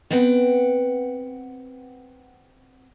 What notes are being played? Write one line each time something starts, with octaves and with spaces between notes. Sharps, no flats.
B3 C4 B4 F#5 G5